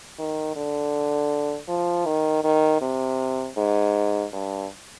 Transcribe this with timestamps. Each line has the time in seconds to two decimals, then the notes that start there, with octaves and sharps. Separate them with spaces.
0.19 D#3
0.56 D3
1.69 F3
2.06 D#3
2.44 D#3
2.81 C3
3.57 G#2
4.33 G2